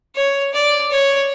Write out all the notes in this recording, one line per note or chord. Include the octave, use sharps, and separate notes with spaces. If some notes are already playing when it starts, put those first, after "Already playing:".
C#5
D5
C#5